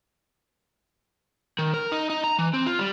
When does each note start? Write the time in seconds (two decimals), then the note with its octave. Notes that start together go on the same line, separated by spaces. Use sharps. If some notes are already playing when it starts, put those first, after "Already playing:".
1.59 D#3
1.74 A#4
1.92 D#4
2.10 D#4
2.24 A#5
2.39 E3
2.54 C4
2.66 F4
2.79 G3